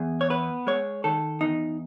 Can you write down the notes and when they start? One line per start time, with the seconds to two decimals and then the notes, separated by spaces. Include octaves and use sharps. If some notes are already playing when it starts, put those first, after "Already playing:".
Already playing: E2 G#4
0.21 C#5
0.30 B3 B4
0.67 G#3 C#5
1.04 D#3 A4
1.41 E2 D#4